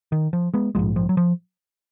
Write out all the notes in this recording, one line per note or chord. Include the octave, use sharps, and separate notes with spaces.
D#3
F3
G#3 B3
A#1 G#2 F3 G#3
F3
F#3
F3